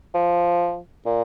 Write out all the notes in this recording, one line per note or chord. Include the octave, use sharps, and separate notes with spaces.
F3
A#2